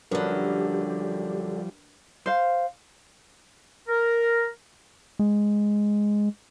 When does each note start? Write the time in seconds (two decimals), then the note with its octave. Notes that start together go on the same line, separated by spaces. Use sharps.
0.11 F#2 D3 F3 G3 D4 G4 A#4 B4
2.26 C5 F5
3.89 A#4
5.19 G#3